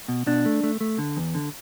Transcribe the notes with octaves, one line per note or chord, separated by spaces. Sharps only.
B2
B2 D4
A3
A3
A3
D3
E2
D3